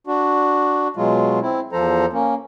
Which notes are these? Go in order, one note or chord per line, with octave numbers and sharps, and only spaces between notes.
D4 F#4
B2 F#3 G#3 F4
C4 E4
E2 F3 A4 C5 A#5
A#3 C#4